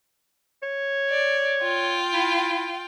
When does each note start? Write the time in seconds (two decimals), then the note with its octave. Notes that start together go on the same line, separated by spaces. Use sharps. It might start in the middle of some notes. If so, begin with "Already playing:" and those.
0.63 C#5
1.10 D5
1.62 F4 G5
2.14 E4